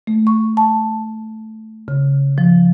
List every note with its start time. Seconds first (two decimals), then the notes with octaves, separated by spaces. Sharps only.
0.07 A3
0.27 C#6
0.57 A5
1.88 C#3
2.38 F3